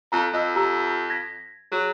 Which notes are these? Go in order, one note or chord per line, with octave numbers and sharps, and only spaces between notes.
F2 A4 A#5
F2 D#5 E6
G4 A#5 E6
G#6 A#6 B6
F#3 G#4